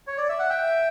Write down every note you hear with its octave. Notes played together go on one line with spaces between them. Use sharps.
C#5
D5
E5
F#5
E5 G5